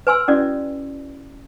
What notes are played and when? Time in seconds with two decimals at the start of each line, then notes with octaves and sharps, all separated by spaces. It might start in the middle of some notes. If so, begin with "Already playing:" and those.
0.07 B4 G#5 C6 E6
0.28 C#4 E4 F#4 D5 D#6